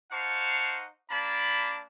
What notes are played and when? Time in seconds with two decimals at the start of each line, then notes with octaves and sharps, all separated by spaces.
0.12 D#4 C5 F5 F#5 A5 C#6
1.10 A#3 D4 D5 A5 B5